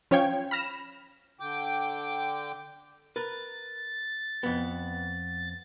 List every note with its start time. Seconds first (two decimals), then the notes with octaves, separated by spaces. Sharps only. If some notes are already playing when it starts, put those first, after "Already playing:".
0.11 F3 C#4 C#5 F5 G5 G#6
0.51 B5 F6 A#6 E7
1.40 D3 G5 D6
3.16 A#4 B4 A6
4.43 F2 B3